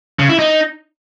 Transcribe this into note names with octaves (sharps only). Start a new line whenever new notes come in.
C#3
E4
D#4